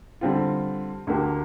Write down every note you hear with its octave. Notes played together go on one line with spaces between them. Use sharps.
D3 G3 C4 F4
D2 D3 A#3 G4